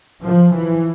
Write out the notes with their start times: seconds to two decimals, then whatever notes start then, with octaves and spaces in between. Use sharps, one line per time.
0.23 F3
0.54 E3